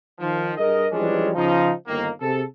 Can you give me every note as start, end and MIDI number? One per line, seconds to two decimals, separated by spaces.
0.19 0.52 51
0.19 0.52 53
0.57 0.85 43
0.57 0.85 68
0.57 0.85 70
0.57 0.85 75
0.92 1.30 52
0.92 1.30 53
0.92 1.30 55
0.92 1.30 56
0.92 1.30 61
0.92 1.30 62
1.35 1.71 49
1.35 1.71 53
1.35 1.71 63
1.87 2.08 31
1.87 2.08 51
1.87 2.08 58
2.21 2.42 48
2.21 2.42 68
2.21 2.42 69